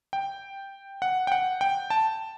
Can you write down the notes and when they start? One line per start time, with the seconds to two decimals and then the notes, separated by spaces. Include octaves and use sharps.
0.13 G5
1.02 F#5
1.27 G5
1.32 F#5
1.61 G5
1.90 A5